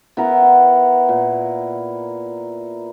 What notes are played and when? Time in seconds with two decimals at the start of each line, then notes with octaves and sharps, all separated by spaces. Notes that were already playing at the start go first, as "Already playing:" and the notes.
0.17 B3 E4 A#4 F#5
1.09 A#2